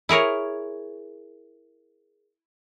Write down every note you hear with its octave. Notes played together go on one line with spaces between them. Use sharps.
E4 G#4 A#4 C#5